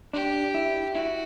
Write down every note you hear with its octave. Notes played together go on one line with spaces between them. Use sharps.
D4 G4
E4
E4 F#4